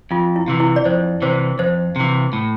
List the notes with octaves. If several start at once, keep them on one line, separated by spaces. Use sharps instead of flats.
F2 F4
E4
C3 E3
E4
D5
F2 C5
C3 E3 C5
F2 C5
C3 E3
A2